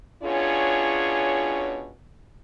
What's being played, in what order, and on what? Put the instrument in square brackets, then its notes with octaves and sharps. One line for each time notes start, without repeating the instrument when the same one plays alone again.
[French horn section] B2 C#4 D4 F4 G#4 C#5